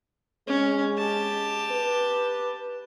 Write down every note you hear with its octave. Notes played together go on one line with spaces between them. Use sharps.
G#3 C#4
G4 A5
B4